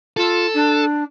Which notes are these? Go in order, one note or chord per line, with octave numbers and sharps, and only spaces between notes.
F4 A4
D4